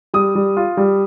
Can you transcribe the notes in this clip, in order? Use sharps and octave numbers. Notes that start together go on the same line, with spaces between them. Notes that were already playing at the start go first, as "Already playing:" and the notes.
G3 D#6
G3
F4
G3